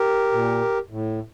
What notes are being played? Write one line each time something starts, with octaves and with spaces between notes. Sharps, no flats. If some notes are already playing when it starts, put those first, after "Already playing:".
Already playing: G4 A#4
A#2
A2